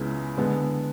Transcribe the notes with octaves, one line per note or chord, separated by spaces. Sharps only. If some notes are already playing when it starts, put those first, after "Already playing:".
Already playing: C#2 C#3 G#3 B3 E4
D3 G#3 B3